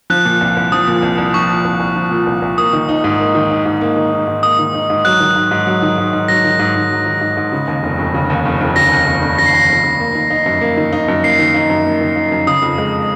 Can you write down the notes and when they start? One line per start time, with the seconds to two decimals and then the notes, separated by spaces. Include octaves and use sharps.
0.10 F3 F#6
0.25 A#2
0.41 C2
0.57 C2
0.72 F3 D#6
0.88 A#2
1.03 C2
1.18 C2
1.34 F3 C#6
1.49 A#2
1.65 C2
1.80 C2
1.96 F3
2.11 A#2
2.27 C2
2.42 C2
2.58 A#3 D#6
2.73 D#3
2.89 D#4
3.04 G#2
3.20 A#3
3.35 D#3
3.50 D#4
3.66 G#2
3.81 A#3
3.97 D#3
4.12 D#4
4.28 G#2
4.43 A#3 D#6
4.59 D#3
4.74 D#4
4.90 G#2
5.05 F#3 F#6
5.20 D#3
5.36 G#2
5.51 G#2
5.67 F#3
5.82 D#3
5.98 G#2
6.13 G#2
6.28 F#3 A#6
6.44 D#3
6.59 G#2
6.75 G#2
6.91 F#3
7.06 D#3
7.21 G#2
7.37 G#2
7.52 C#3
7.68 D#2
7.83 F1
7.99 F1
8.14 C#3
8.30 D#2
8.46 F1
8.61 F1
8.76 C#3 A#6
8.92 D#2
9.07 F1
9.22 F1
9.39 C#3 A#6
9.46 C7
9.53 D#2 A#6
9.69 F1
9.85 F1
10.00 A#3
10.15 D#3
10.30 D#4
10.46 F#2
10.61 A#3
10.77 D#3
10.93 D#4
11.08 F#2
11.23 A#3 C7
11.39 D#3
11.54 D#4
11.70 F#2
11.85 A#3
12.01 D#3
12.16 D#4
12.32 F#2
12.47 C#3 D#6
12.62 F2
12.78 G#3